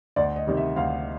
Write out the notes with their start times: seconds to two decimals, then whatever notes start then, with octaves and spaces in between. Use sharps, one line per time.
0.16 D2 D5
0.36 D#5
0.47 C3 D#3 G3
0.57 E5
0.76 D2 F5